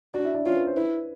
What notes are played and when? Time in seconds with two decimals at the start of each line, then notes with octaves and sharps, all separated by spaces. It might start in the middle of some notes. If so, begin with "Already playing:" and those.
0.14 D4 F#4 D5
0.24 E4 E5
0.34 D4 D5
0.45 C#4 F4 C#5
0.56 B4
0.67 C5
0.76 E4 B4